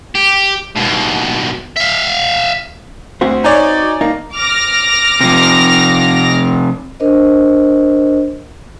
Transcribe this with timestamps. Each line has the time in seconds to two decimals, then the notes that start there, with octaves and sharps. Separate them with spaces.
0.15 G4
0.76 D#2 B2
1.77 E5 F5
3.21 D2 C4 F#4 C5
3.44 D#4 C#5 D5 G#5
4.01 A#3 D#4
4.34 D6 F6 A#6
5.21 C3 F3
7.00 D4 A#4 C5 D#5